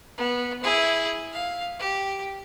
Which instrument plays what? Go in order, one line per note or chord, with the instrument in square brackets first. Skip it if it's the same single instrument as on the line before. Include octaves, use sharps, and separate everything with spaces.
[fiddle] B3
E4 G#4
F5
G4